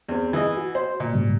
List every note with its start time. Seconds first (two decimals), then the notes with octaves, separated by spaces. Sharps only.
0.08 E2 C4
0.33 E3 G#4 D#5
0.57 F#4
0.75 C5
1.00 A#2
1.13 G#2 C#3 G3